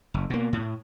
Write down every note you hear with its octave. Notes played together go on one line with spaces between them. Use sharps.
F#1
B2 A#3
A2